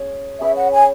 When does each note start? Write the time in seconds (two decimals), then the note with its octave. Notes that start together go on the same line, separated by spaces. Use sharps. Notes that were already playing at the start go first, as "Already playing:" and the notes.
Already playing: C#4 G#4
0.40 C#4 G#4 B4 E5
0.56 F#5
0.73 G#5